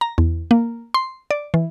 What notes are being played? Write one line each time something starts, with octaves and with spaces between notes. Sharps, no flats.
A#5
E2
A#3
C6
D5
E3